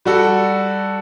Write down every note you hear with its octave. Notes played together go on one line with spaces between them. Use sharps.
G3 F#4 A4